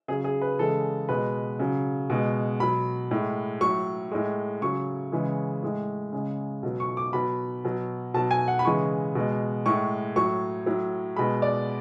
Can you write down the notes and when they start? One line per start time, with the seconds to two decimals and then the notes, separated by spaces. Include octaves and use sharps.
0.08 C#3 F#3 G#4
0.24 G#4
0.41 B4
0.59 C#3 E3 G#3 A4
1.09 B2 G#3 B4
1.59 C#3 F#3
2.10 B2 G#3
2.60 B2 F#3 B5
3.11 A2 G#3
3.61 A2 F#3 C#6
4.11 A2 G#3
4.61 C#3 F#3 C#6
5.12 C#3 E3 G#3
5.62 A2 G#3
6.13 C#3 G#3
6.63 B2 F#3
6.80 C#6
6.97 D6
7.13 B2 F#3 B5
7.65 B2 F#3
8.14 B2 F#3 A5
8.31 G#5
8.48 F#5
8.59 B5
8.65 C#3 E3 G#3 C#6
9.15 B2 G#3
9.66 A2 G#3 C#6
10.16 A2 F#3 C#6
10.66 A2 F#3
11.17 B2 G#3 B5
11.42 D5